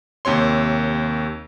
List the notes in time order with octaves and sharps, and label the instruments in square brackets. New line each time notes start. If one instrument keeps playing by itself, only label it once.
[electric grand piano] D#2 C3 C#5 C6